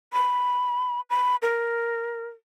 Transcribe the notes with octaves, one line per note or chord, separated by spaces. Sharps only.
B5
B5
A#4